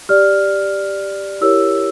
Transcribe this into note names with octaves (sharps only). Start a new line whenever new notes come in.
G4 D5 F6
E4 G4 A#4 C#5 E6